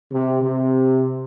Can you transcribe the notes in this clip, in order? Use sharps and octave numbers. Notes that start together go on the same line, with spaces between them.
C3
C3